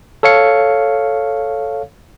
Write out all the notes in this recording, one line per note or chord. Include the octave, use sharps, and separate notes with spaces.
A4 C#5 F5 C#7